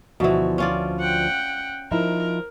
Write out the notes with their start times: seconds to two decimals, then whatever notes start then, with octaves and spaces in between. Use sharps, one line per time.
0.20 D2 B2 E3 F3 F#4
0.58 C#4 F4 D5
1.00 F#5 G5
1.91 F3 D#4 E4 A#4